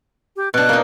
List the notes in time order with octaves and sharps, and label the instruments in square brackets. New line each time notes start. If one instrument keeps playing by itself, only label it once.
[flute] G4
[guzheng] B2 D4 [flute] F#6
[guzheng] A#3 D#4